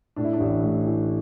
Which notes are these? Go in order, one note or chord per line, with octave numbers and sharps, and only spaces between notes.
A2 D4
E4
D4
A1
A2
E3